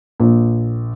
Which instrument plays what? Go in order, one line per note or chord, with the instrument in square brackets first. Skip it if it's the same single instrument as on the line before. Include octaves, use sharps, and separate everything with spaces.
[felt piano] A#1